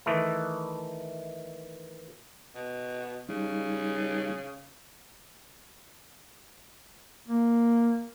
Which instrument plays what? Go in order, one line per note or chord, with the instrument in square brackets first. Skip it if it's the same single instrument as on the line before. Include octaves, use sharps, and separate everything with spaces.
[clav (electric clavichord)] D#3 E3 A3
[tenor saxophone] B2
[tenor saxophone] C#3 [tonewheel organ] G3 D#4
[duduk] A#3